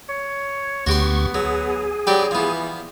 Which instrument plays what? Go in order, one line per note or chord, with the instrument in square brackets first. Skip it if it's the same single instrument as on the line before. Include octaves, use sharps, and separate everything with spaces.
[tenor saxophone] C#5
[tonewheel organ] D2 C#6 [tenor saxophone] B3 [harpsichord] F#4 G4 C6
[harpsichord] F#3 [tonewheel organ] G#4
[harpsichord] F#3 D4 B4 [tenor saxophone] G4
[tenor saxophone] E3 [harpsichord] F3 B3